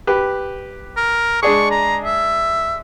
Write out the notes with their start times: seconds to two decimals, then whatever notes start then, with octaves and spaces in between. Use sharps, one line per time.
0.07 G4 B4
0.97 A#4
1.43 G#3 D4 G#4 C#6
1.71 A#5
2.05 E5